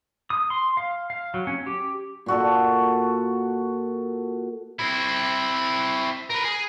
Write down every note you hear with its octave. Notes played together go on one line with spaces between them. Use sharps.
D#6
C6
F5
F5
F#3
C#4
G4
A#2 F#4 A4
C4 E4
A#4 B4
G#4